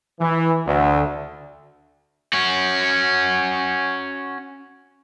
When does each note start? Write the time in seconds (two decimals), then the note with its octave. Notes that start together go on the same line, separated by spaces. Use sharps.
0.19 E3
0.66 D2
2.33 C#4 F#4